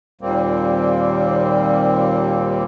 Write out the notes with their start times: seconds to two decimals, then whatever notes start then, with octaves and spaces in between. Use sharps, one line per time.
0.21 D#2 A#2 G3 A#3 C4